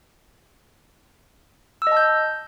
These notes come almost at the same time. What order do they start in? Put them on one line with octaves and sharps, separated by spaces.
E6 D#5 A5 G6